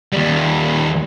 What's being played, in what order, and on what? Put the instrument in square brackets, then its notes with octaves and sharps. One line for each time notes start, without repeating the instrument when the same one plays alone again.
[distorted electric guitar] D#2 G3